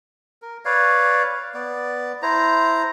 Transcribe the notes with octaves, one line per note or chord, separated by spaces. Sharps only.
A#4
B4 C#5 D5 F5
B3 D5
E4 C5 A#5